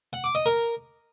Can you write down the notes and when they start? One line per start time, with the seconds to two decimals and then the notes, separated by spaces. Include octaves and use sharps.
0.13 F#5
0.24 D6
0.35 D#5
0.46 A#4